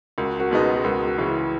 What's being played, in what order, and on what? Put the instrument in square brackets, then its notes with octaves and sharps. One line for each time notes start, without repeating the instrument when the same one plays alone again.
[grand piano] C#2 [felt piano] F#4 A#4
[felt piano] F#4 A#4
[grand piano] B2 G#3 B3 D#4
[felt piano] G#4 B4
G#4
[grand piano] C#2 [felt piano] F#4 A#4
[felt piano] F#4
[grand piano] C#3 E3
[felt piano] E4